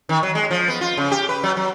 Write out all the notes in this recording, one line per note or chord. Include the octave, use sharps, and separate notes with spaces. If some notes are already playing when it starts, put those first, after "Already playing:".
D#3
F#3
G#3
F3
B3
F4
C#3
G4
B4
F#3
F#3